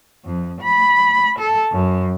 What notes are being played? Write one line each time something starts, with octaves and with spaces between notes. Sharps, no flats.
F2
B5
A4
F#2